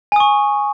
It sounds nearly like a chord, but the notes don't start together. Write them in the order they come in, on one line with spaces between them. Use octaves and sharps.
G#5 D#6 C#6